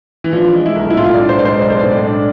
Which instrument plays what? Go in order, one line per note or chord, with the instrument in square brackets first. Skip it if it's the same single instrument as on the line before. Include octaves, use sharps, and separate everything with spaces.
[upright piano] E3
[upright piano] F3 [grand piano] D4
[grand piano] G#3
[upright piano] E4
[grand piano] B1
[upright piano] E4
[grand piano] A2 [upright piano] F4
[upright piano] D5
[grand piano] D4
[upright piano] C5
[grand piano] G#3 [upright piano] D5
[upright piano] C5
[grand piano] B1 [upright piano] D5
[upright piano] C5
[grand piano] A2 [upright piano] D5
[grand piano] D4